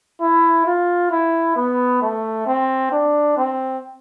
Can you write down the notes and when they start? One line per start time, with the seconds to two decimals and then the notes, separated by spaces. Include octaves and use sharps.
0.21 E4
0.66 F4
1.11 E4
1.56 B3
2.02 A3
2.47 C4
2.92 D4
3.37 C4